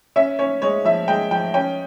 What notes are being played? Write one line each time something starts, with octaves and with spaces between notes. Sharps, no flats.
C#4 E5
C#4 C#5
G#3 C#5
F3 E5
G#3 G5
F3 G5
C#4 G5